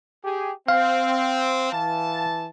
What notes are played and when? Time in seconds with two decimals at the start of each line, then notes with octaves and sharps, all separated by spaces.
0.25 G4 G#4
0.68 C4 F5
1.73 E3 A5